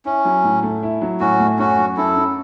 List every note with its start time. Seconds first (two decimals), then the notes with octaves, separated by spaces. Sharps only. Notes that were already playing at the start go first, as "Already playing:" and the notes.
0.05 C#4 E4
0.25 F#3
0.44 A2
0.63 A3
0.83 E4
1.02 F#3
1.20 A2 C#4 F#4
1.40 A3
1.59 F#2 C#4 F#4
1.78 F#3
1.97 F#2 E4 A4
2.16 C#4